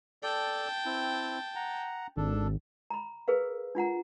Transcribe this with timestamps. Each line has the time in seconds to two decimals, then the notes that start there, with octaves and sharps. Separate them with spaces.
0.23 A4 D5 G5 A5
0.85 C4 E4
1.55 F#5 A#5
2.17 G#1 D4 A4
2.90 A#5 B5
3.28 G#4 A#4 B4 F5
3.75 D4 F4 F#5 A#5